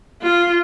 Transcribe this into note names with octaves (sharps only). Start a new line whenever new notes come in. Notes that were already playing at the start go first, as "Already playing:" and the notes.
F4